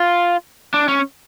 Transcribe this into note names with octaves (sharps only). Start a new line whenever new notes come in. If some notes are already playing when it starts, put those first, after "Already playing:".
Already playing: F4
D4
C#4